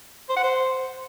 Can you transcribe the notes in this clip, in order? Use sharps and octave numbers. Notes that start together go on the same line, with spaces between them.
C5
F#5
C5